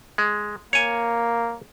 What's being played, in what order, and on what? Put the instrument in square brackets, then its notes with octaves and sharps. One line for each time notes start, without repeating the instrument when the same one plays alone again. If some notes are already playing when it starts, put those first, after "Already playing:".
[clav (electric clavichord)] G#3
[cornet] A#3 [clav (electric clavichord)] C#5 G#5